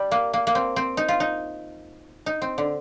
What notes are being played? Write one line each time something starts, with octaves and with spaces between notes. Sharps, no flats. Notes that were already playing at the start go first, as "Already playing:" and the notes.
Already playing: G3
A#3
A#3
A#3
C4
C4
D#4
F4
D#4
D#4
C4
D3